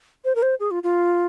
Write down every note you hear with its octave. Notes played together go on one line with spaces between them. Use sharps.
C5
A#4
C5
G#4
F4
F4